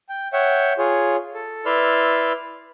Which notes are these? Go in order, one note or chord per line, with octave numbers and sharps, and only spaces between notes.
G5
C#5 E5 F#5 G5
F4 G#4 C#5
A4
E4 B4 D5 C6 E6 F6